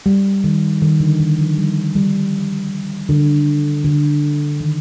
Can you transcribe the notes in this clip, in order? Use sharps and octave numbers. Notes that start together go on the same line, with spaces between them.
G3
D#3
D#3
D3
D#3
F3
G3
G3
D3
D3
D#3